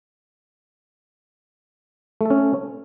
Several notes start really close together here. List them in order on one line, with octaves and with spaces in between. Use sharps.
A3 A4 C#4